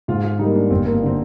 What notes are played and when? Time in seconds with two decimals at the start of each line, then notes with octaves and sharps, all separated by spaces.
0.08 G#2 F4
0.24 F4
0.39 G3 A#3 D#4
0.55 D4
0.70 G1 C4
0.86 A#3
1.03 D3 C4